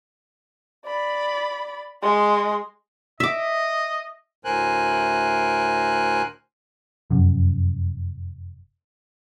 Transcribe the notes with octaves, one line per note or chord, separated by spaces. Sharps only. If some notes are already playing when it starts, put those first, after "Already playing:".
D5 B5
G#3 C6
D#5 E5 D6
D2 A2 A#4 C5 G#5 F#6
F1 F#2